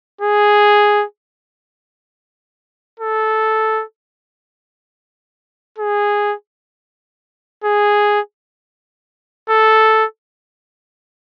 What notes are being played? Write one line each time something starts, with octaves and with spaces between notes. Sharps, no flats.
G#4
A4
G#4
G#4
A4